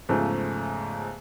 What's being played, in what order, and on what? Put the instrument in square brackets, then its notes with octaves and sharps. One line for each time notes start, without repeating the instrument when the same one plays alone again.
[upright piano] E2 G#2 C#3 F3 A3